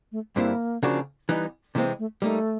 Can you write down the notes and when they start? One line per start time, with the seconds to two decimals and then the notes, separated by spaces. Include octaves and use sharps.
0.12 A3
0.36 G2 D3 G3 A#3 C4 E4
0.83 C#3 F3 A#3 D4 F#4
1.29 E3 G3 B3 D#4
1.75 C3 E3 G#3 A#3 C4
1.99 A3
2.22 G3 A3 A#3 D#4